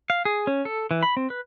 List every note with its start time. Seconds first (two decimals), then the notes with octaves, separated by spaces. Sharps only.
0.10 F5
0.25 G#4
0.47 C#4
0.65 A4
0.91 E3
1.03 B5
1.17 C4
1.30 B4